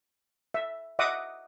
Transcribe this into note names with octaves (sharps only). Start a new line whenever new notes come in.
E5
D#5 E5 F#5 D6 D#6